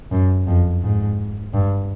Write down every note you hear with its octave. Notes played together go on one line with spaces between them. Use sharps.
F#2
F2
G#2
G2